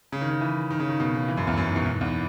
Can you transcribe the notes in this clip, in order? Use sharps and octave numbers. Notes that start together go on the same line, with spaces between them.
C#3
D#3
C#3
E3
D#3
C#3
D#3
B2
C#3
E3
F#2
E2
F#2
G#2
B2
G#2
E2